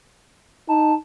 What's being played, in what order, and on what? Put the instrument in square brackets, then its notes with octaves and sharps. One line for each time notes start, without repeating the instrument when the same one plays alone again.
[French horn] D#4 [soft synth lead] A5